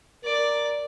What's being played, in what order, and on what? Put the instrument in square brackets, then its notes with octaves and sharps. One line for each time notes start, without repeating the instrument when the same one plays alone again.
[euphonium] A#4 [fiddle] D5